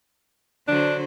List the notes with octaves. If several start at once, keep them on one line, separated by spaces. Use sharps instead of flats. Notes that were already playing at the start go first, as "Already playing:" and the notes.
D3 F#3 D4 C5